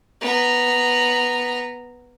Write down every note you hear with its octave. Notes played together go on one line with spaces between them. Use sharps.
B3 A#5